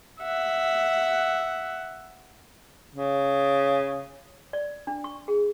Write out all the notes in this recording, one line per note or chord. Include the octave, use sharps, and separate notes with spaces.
E5 F#5
C#3
D5
D4
C#6
G#4